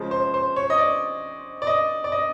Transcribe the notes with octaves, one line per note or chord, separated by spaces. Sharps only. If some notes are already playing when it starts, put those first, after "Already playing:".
Already playing: C#3 F3 G#3
C5
C5
C#5
D#5
D5
D5
D#5
D5
D#5